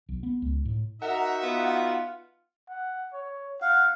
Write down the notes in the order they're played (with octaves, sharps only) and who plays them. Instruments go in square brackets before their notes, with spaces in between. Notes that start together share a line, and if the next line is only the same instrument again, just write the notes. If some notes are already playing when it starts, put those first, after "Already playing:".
[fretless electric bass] B1
B3
C#2
A2
[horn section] D#4 F#4 E5 [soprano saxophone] A#4 [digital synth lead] F#5
[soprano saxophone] B3 [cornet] F4
[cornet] F#5
C#5
[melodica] F5 [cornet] F#5